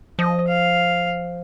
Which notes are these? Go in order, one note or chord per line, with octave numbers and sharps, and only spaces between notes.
F3 D#5
F5